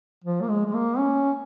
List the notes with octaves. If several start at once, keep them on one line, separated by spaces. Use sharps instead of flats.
F3
A#3
G#3
G#3
A#3
C#4